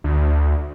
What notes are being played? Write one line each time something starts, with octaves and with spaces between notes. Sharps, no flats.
D2